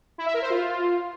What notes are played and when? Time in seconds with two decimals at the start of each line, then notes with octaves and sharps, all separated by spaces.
0.18 E4
0.26 E5
0.34 A#4
0.42 C5
0.50 F4